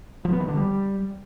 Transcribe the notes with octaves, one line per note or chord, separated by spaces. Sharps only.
F3
B3
D#3
D3
G3